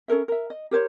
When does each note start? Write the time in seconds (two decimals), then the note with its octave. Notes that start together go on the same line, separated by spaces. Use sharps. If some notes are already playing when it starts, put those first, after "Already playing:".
0.08 C#4 A4 A#4 E5
0.28 A#4 E5
0.50 D#5
0.71 G4 A#4 C5 C#5